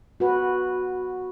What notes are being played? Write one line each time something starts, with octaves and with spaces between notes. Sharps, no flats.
F#4 B4